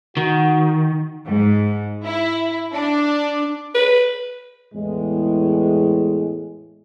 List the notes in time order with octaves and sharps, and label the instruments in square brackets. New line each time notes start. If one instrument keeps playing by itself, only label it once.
[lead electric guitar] D#3 [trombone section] F#4
[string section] G#2
E4
D4
[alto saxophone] B4
[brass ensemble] E2 A2 G#3